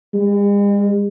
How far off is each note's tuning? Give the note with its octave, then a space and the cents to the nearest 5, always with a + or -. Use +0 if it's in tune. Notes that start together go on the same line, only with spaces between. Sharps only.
G#3 -45